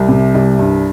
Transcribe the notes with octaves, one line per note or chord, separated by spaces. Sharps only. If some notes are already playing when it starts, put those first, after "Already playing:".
Already playing: C2
C3
C2
G2